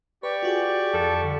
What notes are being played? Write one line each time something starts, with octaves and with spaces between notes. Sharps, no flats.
G4 B4 D5 C#6
F4 F#4 G#4
F2 A4
D3 G3